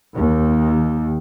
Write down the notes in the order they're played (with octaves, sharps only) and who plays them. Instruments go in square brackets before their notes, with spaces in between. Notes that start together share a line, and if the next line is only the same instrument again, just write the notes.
[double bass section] D#2